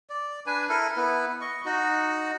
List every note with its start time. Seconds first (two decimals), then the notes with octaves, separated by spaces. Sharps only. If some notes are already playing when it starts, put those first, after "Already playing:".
0.10 D5
0.46 D4 B4 G#5
0.69 E4 A4 A#4
0.97 B3 E4 B4
1.41 D#5 C#6
1.65 D#4 F#4